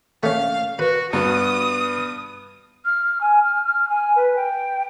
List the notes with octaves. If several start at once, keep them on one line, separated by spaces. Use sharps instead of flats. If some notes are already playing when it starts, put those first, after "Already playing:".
A3 C#4 F5
F#4 B4
G2 B3 F#4 D#6
F6
G#5
F6
F6
G#5
B4
G5